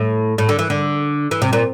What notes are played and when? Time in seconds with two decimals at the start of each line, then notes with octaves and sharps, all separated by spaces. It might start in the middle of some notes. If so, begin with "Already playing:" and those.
Already playing: A2
0.38 A2
0.49 D3
0.59 E3
0.70 D3
1.31 E3
1.42 C3
1.53 A#2